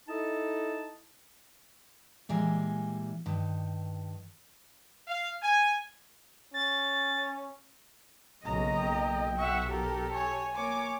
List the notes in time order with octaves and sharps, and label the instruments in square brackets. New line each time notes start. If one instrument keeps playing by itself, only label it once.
[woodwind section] D#4 E4 A4 D#5 A5
[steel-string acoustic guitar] A#2 E3 G3 G#3
G2 D#3
[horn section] F5
G#5
[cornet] C#4 [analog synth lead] A6
[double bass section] B1 C#3 [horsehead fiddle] A#3 D#5 [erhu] A#5
[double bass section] B1 [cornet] G5
[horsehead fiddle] E5 F#5 [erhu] C#6
[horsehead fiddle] G4 A4 [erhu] A#4
[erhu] C#5 [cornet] G#5
[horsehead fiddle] A#3 C#5 [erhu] D6